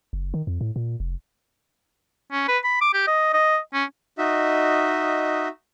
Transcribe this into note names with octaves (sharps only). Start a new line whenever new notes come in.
F#1
D#3
F2
A2
A#2
F1
C#4
B4
B5
D6
G4
D#5
D#5
C#4
D#4 F#4 D#5 E5